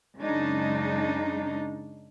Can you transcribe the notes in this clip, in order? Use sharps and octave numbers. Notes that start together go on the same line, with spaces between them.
F#2 C#3 G#3 D4 D#4